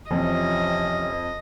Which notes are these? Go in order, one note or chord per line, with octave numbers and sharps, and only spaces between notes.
F2 C3 E3 F3 C#4 D#5